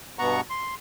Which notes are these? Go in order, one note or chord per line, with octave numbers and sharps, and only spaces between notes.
G2 B2 B3 F#5 A#5 C#6
C6